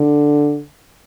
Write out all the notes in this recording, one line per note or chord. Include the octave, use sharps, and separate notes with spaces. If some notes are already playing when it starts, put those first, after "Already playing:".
Already playing: D3